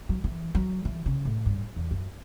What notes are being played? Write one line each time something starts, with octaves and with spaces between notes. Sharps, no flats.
F#3
E3
F#3
E3
C#3
A2
G2
E2
F#2